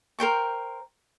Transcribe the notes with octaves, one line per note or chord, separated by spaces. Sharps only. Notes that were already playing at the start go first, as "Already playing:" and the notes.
A#4 C5 G5 C#6